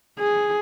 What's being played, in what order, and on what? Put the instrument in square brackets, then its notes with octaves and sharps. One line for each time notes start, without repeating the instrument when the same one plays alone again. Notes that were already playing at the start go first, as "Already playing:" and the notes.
[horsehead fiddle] G#4